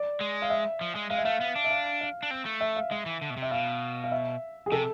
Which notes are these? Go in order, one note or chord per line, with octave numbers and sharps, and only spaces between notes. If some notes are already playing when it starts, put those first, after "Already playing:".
Already playing: D5
G#3
F5
E5
F3
G#3
G#3 F5
E5
A3 F5
B3
D4
E5
F5
F5
D4
C4
A3
E5
F5
G#3 E5
E3
D3
B2
C3
E5
B2 F5
F5
E5
G#4
C3 A4